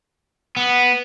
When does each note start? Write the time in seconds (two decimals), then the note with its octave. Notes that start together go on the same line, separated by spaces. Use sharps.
0.56 B3